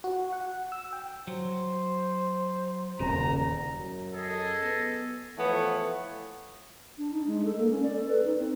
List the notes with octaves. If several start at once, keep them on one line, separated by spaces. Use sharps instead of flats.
F#4
F#5
E6
G5
F#3 C5
D#1 E2 C#3 A#5
F#2
G#4 A4 D#5
B3
E3 F3 A3 B3 C#5
D4
D#4
G#3
A4
A#3
C#4
D5
A4
B4
D#4
C4